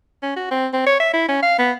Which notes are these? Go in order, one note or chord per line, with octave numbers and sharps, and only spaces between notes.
C#4
F#4
C4
C4
C#5
E5
E4
C#4
F5
B3